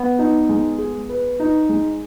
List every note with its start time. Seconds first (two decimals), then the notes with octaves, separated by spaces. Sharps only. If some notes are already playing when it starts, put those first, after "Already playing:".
Already playing: B3 B4
0.19 D#4
0.49 G#3
0.79 G#4
1.09 B4
1.40 D#4
1.69 G#3